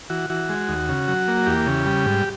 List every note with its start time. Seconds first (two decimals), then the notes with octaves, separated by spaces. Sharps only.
0.10 E3 F#4
0.30 E3 F#4
0.49 G#3
0.69 D#2
0.89 C#3
1.08 F#3
1.28 A#3
1.47 E2 G4
1.67 C#3
1.86 G3
2.06 G#2